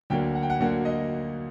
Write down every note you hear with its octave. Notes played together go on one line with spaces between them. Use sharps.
D2 D3 F#3 A#3 G5
F#5
G5
F#5
D2 D3 F#3 A#3 F#5
D#5